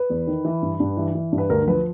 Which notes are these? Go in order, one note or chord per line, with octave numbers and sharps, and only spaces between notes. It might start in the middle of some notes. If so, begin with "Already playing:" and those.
Already playing: B4
E2
D#3
E3
G2
G2
E3
E3
G2
B4
D2 A#4
F3 B4